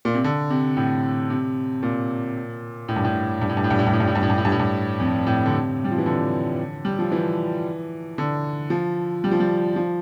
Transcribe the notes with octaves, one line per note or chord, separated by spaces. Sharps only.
A#2
C3
D3
C3
A2
C3
A#2
A2
G2
A2
G2
A2
G2
A2
G2
A2
G2
A2
G2
A2
G2
A2
G2
A2
G2
A2
G2
F2
A2
D3
C3
G3
F3
E3
D3
G3
F3
E3
D3
F3
G3
F3
G3
F3